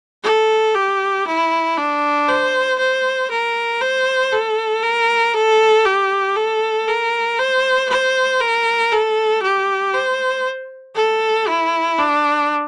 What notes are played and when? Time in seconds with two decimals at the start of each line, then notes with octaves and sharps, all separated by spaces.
0.23 A4
0.75 G4
1.27 E4
1.77 D4
2.28 C5
2.79 C5
3.30 A#4
3.81 C5
4.32 A4
4.83 A#4
5.34 A4
5.85 G4
6.36 A4
6.88 A#4
7.39 C5
7.89 C5
8.41 A#4
8.92 A4
9.42 G4
9.94 C5
10.95 A4
11.47 E4
11.99 D4